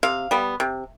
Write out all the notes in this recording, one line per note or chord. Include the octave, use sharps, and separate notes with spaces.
C3 F5
G3 B3
C3